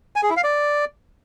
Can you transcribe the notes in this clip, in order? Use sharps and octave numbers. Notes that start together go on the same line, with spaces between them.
G#5
G#4
E4
F5
D5